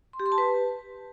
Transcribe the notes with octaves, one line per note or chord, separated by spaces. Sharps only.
C6
G4
C6
A5
B4